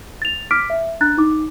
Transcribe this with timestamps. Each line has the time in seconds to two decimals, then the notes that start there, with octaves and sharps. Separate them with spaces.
0.22 A6 F7
0.51 D6 F6 B6 D7
0.70 E5
1.01 D4 A#5 F#6 A6
1.18 D#4 D6